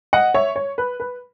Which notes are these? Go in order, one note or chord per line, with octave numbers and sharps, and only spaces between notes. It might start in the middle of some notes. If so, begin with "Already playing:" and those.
D#5 F#5
C#5 E5
C#5
B4
B4